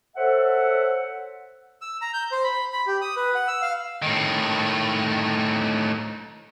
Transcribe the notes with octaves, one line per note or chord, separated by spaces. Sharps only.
A4 C5 C#5 E5 F#5
E6
A#5
G6
C5
B5
B5
G4
D#6
B4
F#5
E6
F5
A2 D#3